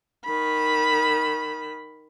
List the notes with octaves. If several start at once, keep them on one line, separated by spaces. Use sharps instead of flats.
D#3 B5